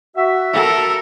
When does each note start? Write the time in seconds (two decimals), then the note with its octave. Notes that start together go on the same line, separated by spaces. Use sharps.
0.16 F#4 E5
0.53 A4 A#4